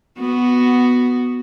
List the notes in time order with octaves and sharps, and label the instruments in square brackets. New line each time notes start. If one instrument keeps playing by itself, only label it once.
[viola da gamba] B3 F#4